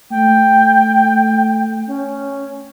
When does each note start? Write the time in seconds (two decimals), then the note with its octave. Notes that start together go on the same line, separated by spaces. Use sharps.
0.11 A3 G5
1.87 C#4